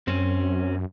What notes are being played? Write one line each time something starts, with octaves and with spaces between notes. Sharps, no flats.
F#2 C4 C#4